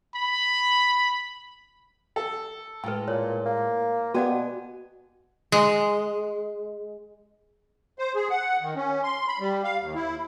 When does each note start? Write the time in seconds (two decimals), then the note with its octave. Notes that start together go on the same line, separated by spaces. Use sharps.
0.15 B5
2.16 A4
2.84 A2 G#3 B4 G5
3.08 A#2 C#5
3.46 A#3
4.14 B3 F#4 G4 D5 F#5 G#5
4.27 B2
5.52 G#3
7.99 C5
8.15 G#4
8.30 F#5
8.61 D#3
8.76 C#4
9.04 C6
9.28 B5
9.40 G3
9.64 F5
9.81 D#2
9.95 E4